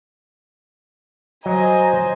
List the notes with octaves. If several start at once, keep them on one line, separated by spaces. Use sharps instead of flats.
F#3 C5 D#5 G#5 A#5